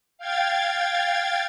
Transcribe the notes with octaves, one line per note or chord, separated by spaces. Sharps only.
F5 G5 G#6 A6